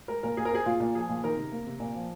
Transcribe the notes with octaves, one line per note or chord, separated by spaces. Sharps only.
G#3 A#4
A#2 A#4
A#2 G#4
A#4
C4 G#4
A#2 F4
A#2
F3 G#4
A#2
D#3 A#4
C3
A#3
C3
A#2
F3